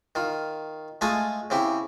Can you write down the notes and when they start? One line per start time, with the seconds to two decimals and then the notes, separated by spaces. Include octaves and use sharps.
0.15 D#3 F4
1.01 G#3 A3 F4 G#5 A5 D#6
1.50 C#3 C4 E4 G4